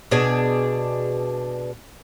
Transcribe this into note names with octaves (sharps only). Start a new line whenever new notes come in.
B2 D4 G#4